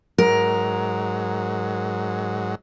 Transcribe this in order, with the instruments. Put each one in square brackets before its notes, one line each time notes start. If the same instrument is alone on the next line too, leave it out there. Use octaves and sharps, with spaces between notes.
[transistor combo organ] G#2 F#3 [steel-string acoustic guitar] A#4